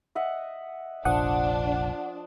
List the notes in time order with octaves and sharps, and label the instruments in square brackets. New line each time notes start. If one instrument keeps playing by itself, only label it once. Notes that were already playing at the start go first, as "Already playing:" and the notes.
[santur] D#5 E5 F#5
[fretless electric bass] F1 A#1 [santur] F3 D#6 [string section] D4 [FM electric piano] F#5